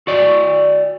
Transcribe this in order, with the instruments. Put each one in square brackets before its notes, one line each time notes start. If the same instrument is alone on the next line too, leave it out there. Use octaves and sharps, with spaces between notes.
[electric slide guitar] F#4 D5 D#5